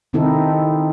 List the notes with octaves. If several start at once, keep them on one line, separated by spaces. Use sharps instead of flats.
C3 D#3 C4 D#4 E4 A4